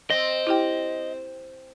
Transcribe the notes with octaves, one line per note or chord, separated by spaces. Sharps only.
C4 D#5
E4 G4 G5